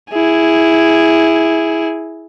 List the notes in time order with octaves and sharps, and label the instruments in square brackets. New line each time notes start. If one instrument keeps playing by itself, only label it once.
[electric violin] E4 G#4